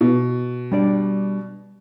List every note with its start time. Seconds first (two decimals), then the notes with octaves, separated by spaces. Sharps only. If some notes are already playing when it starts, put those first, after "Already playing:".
0.01 B2
0.72 G3 D4 D5